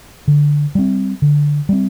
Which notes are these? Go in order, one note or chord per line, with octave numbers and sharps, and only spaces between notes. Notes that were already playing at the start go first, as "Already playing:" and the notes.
D3
G3 C4
D3
G3 C4